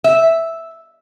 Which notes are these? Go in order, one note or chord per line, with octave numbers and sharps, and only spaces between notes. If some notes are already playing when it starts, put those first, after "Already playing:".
E5